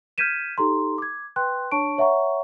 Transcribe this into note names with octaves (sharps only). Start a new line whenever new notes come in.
F6 G6 G#6 B6 D#7 E7
D#4 G4 A4 A#5 C6
D6 G#6
B4 G5 C6 F#6
D4 C#5 A5 C#6 D7
C#5 E5 F#5 A#5 C#6